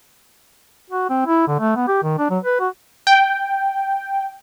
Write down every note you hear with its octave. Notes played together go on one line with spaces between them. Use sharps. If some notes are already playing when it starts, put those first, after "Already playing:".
F#4
C4
E4
D3
A3
B3
G4
D#3
D4
F#3
B4
F#4
G5